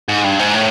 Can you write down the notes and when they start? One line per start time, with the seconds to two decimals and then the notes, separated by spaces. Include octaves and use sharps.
0.08 G#2
0.24 G2
0.39 G#2
0.54 A2